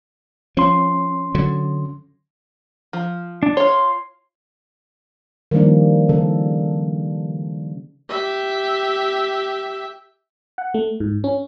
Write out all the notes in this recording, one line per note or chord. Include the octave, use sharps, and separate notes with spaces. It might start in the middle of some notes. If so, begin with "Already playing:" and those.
F3 C#4 C6
D3 F#3
F3
D4
F4 C#5 C6
D#3 F3 G3 A#3 D4
C#3 A4
G4 E5
F#5
A3
G#2
C#4